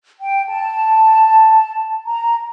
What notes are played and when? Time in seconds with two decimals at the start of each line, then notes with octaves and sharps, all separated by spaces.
0.20 G5
0.49 A5
2.05 A#5